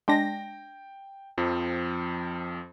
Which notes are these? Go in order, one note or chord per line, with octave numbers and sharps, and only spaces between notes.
G#3 D4 G5 A#6
F2 F3 C4